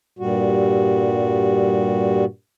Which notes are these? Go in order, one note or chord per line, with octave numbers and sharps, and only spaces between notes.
G2 A#2 G3 F#4